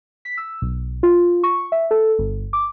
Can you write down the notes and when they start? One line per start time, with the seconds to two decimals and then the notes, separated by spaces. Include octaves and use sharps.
0.25 B6
0.37 E6
0.62 B1
1.03 F4
1.44 C#6
1.72 E5
1.91 A4
2.19 G1
2.53 D6